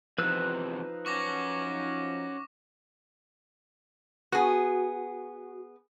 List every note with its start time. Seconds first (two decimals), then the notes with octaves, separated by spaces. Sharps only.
0.18 E2 C3 F3 D#4 B4 E6 F#6
1.06 C#4 F#4 C#6 D6 A#6
4.32 B3 F#4 G#4